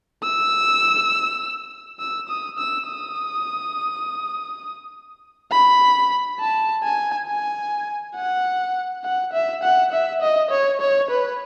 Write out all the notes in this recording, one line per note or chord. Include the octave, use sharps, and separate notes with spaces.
E6
E6
D#6
E6
D#6
B5
A5
G#5
G#5
F#5
F#5
E5
F#5
E5
D#5
C#5
C#5
B4